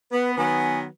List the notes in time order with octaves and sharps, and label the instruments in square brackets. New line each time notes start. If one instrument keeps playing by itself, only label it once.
[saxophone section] B3 [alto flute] B4
[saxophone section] D#3 F#3 B3 [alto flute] G#5